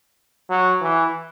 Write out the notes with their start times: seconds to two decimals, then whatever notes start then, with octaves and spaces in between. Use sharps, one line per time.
0.50 F#3
0.81 E3